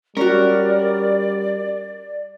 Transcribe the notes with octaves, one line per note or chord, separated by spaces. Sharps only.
G3 C#4 F#4 A#4 D5